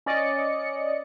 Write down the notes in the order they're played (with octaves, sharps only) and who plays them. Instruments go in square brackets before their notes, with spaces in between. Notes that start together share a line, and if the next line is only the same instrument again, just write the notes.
[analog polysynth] C#4 D5 D#5 C#7